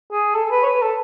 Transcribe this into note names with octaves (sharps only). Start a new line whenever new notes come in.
G#4
A4
A4
B4
C#5
B4
A4